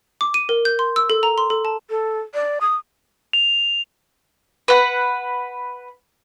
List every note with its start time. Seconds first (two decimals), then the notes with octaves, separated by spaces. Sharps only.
0.21 D6
0.34 D#7
0.49 A#4
0.65 G6
0.79 C6
0.96 E6
1.10 A4
1.23 A#5
1.38 C6
1.50 A4
1.65 A5
1.90 A4
2.34 D5
2.61 D#6
3.33 F7
4.68 B4 F#5